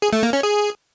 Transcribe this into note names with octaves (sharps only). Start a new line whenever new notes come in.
G#4
A3
A#3
C#4
G#4